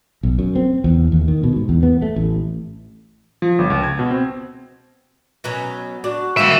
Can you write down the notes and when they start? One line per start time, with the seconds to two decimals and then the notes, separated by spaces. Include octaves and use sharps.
0.23 B1
0.39 F#2
0.56 C4
0.84 E2
1.12 D#2
1.28 D#3
1.43 B2
1.56 G#2
1.69 E2
1.83 B3
2.02 A3
2.16 A1
3.42 F3
3.59 G1
3.70 C#2
3.83 G#6
3.99 B2
4.11 C4
5.44 B2 F#3 C#4
6.04 D4 F#4
6.37 G#2 A#3 G4 E5 F5